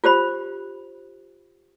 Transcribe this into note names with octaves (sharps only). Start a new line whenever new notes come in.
F4 G4 C5 B5